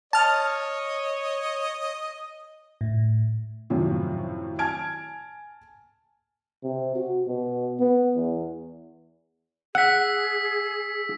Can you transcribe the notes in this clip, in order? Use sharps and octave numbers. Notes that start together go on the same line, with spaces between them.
C#5 D#5 A5 F6
A2
G#1 F#2 A2 C3 F3
G#5 A5 F6 G#6 D7
C3
F#4
B2
B3
E2
G#4 F#5 E6 B6